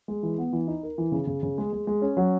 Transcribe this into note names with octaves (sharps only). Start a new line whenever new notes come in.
G#3
E3
B3
E3
D#4
A#4
E3
C#3
C#3
C#3
G#3
G#3
G#3
C#4
F#3